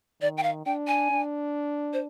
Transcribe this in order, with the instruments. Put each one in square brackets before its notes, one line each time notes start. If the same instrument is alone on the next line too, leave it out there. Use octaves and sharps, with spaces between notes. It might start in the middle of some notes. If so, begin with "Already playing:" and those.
[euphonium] D#3 [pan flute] D5
[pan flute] G5
F5
[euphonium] D4 [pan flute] G5
[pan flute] G#5
[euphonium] D4
[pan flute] C5